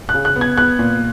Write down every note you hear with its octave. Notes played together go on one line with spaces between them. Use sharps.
F#6
C#3
F#6
B3
G#6
B3 F#6
A#2